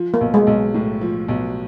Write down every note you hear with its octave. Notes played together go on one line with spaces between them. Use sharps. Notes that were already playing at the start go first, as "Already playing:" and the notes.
Already playing: F3
A#3
B1
G#3
B1
A2
F3
B1